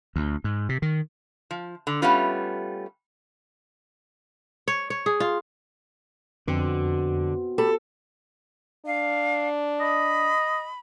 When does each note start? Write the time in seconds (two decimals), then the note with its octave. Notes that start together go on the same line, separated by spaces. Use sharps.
0.16 D2
0.44 G#2
0.69 C3
0.82 D#3
1.51 F3
1.87 D3
2.02 G3 A3 B3 C#4 F4
4.68 C#5
4.90 C#5
5.06 G#4
5.20 F4
6.48 F2 B2 D3 C4
7.58 G4 A4 B5
8.86 D4 F5
9.80 D#5 B5